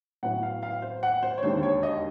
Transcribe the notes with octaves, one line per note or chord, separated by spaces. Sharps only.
A2 F#3 B3 E4 F#5
F5
F5
C5
F#5
C5
C#5
E1 D#2 D3 C5
C#5
D#5